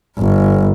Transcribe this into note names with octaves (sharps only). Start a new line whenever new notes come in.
G1